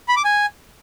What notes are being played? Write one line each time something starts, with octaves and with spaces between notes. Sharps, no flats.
B5
D6
G#5